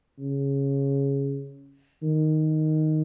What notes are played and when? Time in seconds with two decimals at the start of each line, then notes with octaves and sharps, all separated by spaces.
0.19 C#3
2.03 D#3